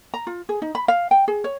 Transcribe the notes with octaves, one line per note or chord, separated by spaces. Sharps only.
A#5
F4
G#4
D#4
B5
F5
G5
G#4
C#5